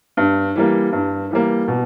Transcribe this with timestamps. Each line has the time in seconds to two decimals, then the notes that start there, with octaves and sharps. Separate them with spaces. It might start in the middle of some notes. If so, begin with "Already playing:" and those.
0.17 G2
0.56 E3 G3 A#3
0.92 G2
1.31 E3 G3 A#3
1.68 B2